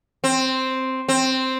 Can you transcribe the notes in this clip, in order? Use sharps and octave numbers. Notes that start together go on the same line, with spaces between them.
C4
C4